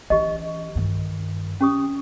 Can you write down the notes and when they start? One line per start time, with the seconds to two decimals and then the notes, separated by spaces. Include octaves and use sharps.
0.10 E3 C#4 G4 D#5
0.75 G2 D#3
1.61 C#4 G4 D#6